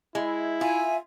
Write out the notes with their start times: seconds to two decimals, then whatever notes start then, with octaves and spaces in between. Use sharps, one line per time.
0.15 G#3 E4
0.61 F4 E5 G#5